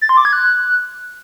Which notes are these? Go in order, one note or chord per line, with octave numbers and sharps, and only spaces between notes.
A6
C6
D6
G#6
F#6